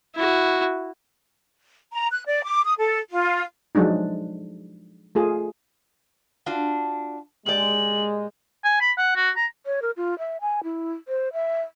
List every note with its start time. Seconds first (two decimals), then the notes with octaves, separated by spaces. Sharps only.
0.16 E4 F#4
1.93 A#5
2.11 F#6
2.26 D5
2.44 D6
2.64 D#6
2.78 A4
3.10 F4
3.75 F3 F#3 G#3 D4 D#4
5.15 A3 F4 G#4
6.46 D4 F4 F#4
7.46 A#2 G#3 G4 D5 F#7
8.64 G#5
8.81 B5
8.98 F#5
9.16 F#4
9.36 A#5
9.66 C#5
9.82 A#4
9.97 F4
10.18 E5
10.41 G#5
10.64 E4
11.08 C5
11.33 E5